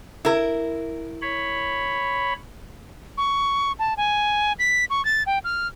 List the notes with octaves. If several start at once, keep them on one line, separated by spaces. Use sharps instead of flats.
E4 A#4
C#5 B5
C#6
A5
G#5
B6
C#6
A6
G5
F6